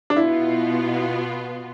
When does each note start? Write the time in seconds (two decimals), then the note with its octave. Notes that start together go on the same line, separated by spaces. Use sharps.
0.10 D4
0.16 B2 B3 E4 F4